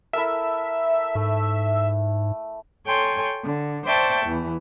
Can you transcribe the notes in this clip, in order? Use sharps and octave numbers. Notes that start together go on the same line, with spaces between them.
E4 A4 A#4 E5
G#2 A3
A4 C#5 G5 G#5 C6
D3
C5 D5 E5 G5 A5 C#6
E2 E3